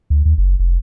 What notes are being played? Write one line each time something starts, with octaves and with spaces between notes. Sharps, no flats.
D2
D#2
F#1
F1